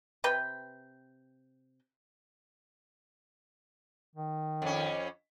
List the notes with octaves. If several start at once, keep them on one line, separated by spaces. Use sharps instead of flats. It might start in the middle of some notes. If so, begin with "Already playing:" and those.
C3 B4 G5
D#3
F2 C#4